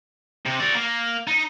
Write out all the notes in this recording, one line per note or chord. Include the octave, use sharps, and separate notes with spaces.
C3
F#4 D5
A#3
D#4